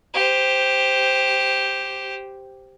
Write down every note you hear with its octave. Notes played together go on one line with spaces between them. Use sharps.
G4 C5